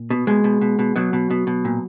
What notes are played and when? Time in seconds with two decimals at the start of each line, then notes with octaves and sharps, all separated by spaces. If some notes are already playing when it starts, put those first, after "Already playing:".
Already playing: A#2
0.10 B2
0.27 B2 G#3
0.44 B2
0.61 B2
0.79 B2
0.96 B2 F#3
1.13 B2
1.31 B2
1.47 B2
1.65 A#2